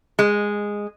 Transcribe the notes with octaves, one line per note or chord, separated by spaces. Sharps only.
G#3